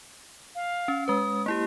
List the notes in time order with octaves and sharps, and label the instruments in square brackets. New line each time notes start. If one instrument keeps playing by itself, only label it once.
[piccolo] F5
[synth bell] C#4
[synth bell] G#3 B4 [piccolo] D#6
[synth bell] A#3 E4 G4